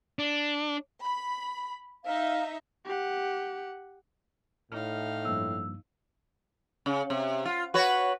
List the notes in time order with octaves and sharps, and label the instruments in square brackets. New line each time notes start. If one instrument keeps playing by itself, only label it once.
[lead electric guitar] D4
[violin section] B5
[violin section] D#4 E5 [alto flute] F5
[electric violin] G4 F#5
[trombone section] A2 [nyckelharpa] D#4 F5 [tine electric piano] F6
[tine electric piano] G2 F3 A#3 [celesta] E6
[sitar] C#3
C3
F4
F#4 B4 C#5